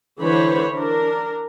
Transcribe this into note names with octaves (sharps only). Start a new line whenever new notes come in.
D3 E3 C5 C#5 B5
D4 A#4